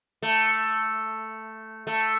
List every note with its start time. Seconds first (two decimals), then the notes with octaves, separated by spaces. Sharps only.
0.22 A3
1.87 A3